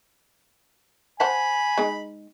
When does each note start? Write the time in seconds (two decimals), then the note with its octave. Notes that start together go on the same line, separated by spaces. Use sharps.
1.20 C5 F#5 G#5 A5 B5
1.78 G#3 D#4